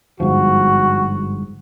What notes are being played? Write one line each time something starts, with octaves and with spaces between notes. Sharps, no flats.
G1 G#2 F3 F#4